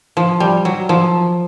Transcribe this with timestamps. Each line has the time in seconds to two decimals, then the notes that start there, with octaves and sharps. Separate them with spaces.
0.17 F3
0.40 G3
0.65 F#3
0.89 F3